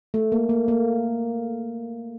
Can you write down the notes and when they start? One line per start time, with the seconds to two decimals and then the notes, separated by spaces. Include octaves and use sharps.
0.14 A3
0.32 A#3
0.49 A#3
0.68 A#3